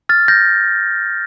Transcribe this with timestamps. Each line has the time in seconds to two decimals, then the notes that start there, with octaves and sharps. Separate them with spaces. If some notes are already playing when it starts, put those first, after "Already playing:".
0.09 F6 A6
0.28 G6 A#6